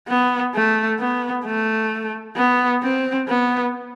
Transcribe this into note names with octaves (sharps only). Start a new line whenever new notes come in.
B3
A3
B3
A3
B3
C4
B3